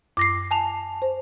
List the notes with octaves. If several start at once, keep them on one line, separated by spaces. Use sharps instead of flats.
F#2 D6 A#6 C7
G#5 A5 F7
C5